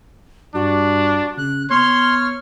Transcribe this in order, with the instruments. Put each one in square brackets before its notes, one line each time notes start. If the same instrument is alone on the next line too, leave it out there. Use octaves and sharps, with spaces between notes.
[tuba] G2 [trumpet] D4 [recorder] F#4
[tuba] C#3 [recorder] F#6
[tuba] B3 [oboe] C#5 [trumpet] C6 [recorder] F6